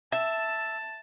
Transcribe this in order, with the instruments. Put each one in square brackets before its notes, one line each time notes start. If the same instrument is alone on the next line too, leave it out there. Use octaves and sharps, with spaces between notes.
[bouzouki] E5 [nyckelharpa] A5